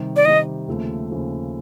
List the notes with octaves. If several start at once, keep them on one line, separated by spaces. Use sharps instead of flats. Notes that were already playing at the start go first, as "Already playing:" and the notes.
Already playing: C3 D#3 G3
D5
C3 D#3 G3 D#5
D#2 C#3 F3 A3 C4
D#2 C#3 F3 A3 C4